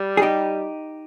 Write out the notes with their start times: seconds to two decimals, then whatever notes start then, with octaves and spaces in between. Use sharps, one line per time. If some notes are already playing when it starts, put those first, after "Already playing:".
Already playing: G3
0.17 G#4
0.22 D#4 G4